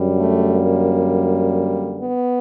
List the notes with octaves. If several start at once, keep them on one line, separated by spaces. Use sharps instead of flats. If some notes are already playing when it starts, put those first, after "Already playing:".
Already playing: F#2 D3 G3
A3
A#3
B3